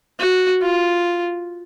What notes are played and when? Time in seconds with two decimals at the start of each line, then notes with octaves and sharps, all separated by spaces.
0.19 F#4
0.62 F4